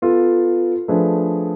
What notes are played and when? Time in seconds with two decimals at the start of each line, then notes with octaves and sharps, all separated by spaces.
0.02 B3 F4 A4
0.88 F3 A3 D4 G#4 B4